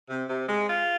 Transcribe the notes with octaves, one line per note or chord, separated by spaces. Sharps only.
C3
C3
G#3
F4